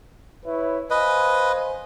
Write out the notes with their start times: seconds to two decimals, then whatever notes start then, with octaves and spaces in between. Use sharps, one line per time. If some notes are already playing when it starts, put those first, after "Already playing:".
0.45 E4 B4 C#5
0.90 B4 C5 D#5 F5 G#5